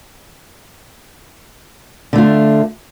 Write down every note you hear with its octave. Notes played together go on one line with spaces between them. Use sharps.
D3 A3 F4